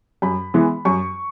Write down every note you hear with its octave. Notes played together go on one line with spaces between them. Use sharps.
F#2 B5
E3 G#3 B3
F#2 C#6